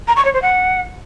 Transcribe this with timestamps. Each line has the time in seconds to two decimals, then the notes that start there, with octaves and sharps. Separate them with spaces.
0.08 A#5
0.16 C#6
0.25 C#5
0.34 C5
0.42 F#5